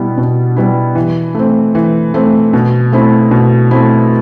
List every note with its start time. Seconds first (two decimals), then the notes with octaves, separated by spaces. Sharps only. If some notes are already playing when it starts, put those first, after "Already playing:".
Already playing: B2 G3 B3 E4
0.17 B2
0.56 G3 B3 E4
0.95 E3
1.35 A3 C4
1.75 E3
2.14 A3 C4
2.53 B2
2.92 A3 C4 E4
3.31 B2
3.71 A3 C4 E4